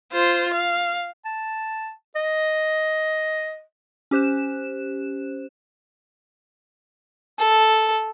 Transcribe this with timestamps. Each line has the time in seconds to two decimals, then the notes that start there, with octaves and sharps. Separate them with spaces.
0.13 F4 C5
0.54 F5
1.25 A5
2.16 D#5
4.11 C#4 G4 C5 F#6 E7
7.39 A4